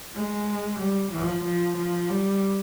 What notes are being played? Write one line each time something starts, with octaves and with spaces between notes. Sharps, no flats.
G#3
G3
F3
F3
F3
G3